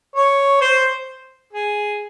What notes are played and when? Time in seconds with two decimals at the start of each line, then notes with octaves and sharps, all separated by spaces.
0.16 C#5
0.61 C5
1.53 G#4